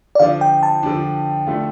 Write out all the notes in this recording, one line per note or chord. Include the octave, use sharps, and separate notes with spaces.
D5
D3 F3 D4 F5
G5
A5
D3 F3 D4
D3 A3 F4